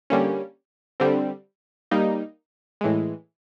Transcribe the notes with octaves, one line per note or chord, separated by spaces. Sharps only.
D3 G3 A#3 C#4
D3 G3 C4
G3 A#3 D#4
A2 E3 G#3